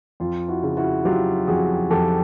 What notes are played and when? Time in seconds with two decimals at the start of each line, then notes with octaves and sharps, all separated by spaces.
0.20 F2 F4
0.48 E4 F#4
0.63 C#3
0.77 E4 F#4
1.05 F#3 F4 G4
1.48 F2 F#4 G#4
1.90 F2 G4 A4